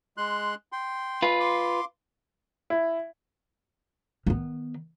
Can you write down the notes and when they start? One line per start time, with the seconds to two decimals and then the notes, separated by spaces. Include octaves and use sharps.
0.17 G#3 C6 F#6
0.72 G5 C6
1.22 F4 B4
1.40 C6 D6
2.70 E4
4.26 D#3 B3